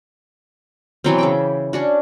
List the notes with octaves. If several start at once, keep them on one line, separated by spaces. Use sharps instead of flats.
B2 E3 F#3 C4
C#3 E5 G5
C#4 D4 F#4